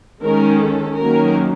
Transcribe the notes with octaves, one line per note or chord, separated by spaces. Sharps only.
D#3 G#3 C#4 A#4
A4
D#3 F#3 A#3 C#4 A#4